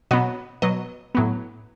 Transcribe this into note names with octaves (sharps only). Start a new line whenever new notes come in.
B2 F#3 B3 D#5
B2 F#3 B3 D#5
A2 F#3 B3